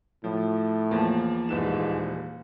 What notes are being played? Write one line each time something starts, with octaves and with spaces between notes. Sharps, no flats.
A2 F3
E2 F3 A#3 A5
D#1 G#2 E3 E7